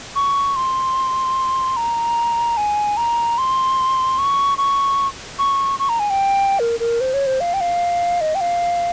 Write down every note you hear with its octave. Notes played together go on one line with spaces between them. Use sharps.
C#6
C6
A#5
G#5
A#5
C6
C#6
C#6
C#6
C#6
A#5
G#5
G5
A#4
A#4
C5
C#5
C5
F5
G5
F5
D#5
G5
F5